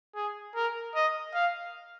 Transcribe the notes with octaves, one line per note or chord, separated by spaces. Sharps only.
G#4
A#4
D#5
F5